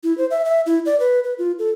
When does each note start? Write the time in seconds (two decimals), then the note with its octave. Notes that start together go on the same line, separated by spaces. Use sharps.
0.04 E4
0.18 C5
0.31 E5
0.45 E5
0.66 E4
0.86 D5
1.00 B4
1.24 B4
1.38 F4
1.59 A4